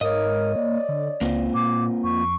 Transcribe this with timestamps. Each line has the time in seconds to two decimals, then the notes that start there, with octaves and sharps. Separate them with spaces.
0.01 G#2 A#4 C#5 D#5
0.56 A#3 D5
0.89 D3
1.21 C#2 A#3 C4 F4
1.55 A#2 D6
2.04 F2 C#6